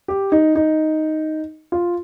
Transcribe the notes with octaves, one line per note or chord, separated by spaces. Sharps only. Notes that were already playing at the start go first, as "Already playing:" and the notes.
G4
D#4
D#4
F4